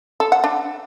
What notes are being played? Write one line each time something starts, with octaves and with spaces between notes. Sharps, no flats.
A4
F#5
D4